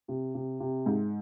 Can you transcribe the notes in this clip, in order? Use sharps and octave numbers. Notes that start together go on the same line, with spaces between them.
C3
C3
C3
G#2